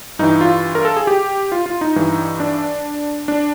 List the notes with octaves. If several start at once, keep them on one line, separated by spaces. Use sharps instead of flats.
G2 E3 D#4
F4
A#4
A4
G#4
G4
F4
F4
D#4
G2 E3
D4
D4